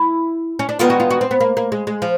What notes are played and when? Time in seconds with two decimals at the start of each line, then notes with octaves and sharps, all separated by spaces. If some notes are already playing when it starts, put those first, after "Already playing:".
Already playing: E4
0.59 C#4
0.69 D4
0.79 G2 D#3 G#3 B3 F4
0.90 F#4
1.00 F4
1.10 F#4
1.21 C4
1.31 B3
1.40 A#3
1.57 A#3
1.72 G#3
1.87 G#3
2.02 F3